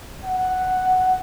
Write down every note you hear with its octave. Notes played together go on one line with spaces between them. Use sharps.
F#5